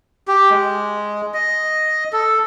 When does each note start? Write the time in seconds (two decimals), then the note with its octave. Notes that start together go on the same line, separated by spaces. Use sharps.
0.28 G4
0.50 G#3
1.34 D#5
2.13 A4